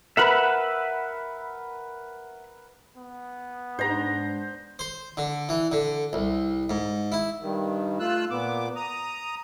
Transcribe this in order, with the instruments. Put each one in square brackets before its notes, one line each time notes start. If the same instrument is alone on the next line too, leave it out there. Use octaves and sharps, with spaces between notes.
[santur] A#4 B4 [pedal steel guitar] E5 F#5 B5
[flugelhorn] B3
[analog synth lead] G#2 [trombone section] D4 [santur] C5 A#5
[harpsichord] C5
D3
E3
D3
C2
G#2
E4
[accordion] G2 D#3
A3 F4 E6 F#6
A#2 B3 D6
A#5 D#6